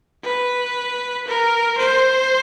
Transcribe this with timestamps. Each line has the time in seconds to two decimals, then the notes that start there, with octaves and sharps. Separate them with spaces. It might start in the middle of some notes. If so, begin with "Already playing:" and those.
0.24 B4
1.28 A#4
1.78 C5